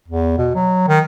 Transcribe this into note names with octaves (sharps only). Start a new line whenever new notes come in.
E2
B2
F#3
D#3